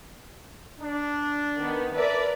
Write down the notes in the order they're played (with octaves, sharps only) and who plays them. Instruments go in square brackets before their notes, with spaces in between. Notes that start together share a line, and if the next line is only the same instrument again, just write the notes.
[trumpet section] D4
[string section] D#3 B3
[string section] A#4 B4 D5 [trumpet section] E5 A5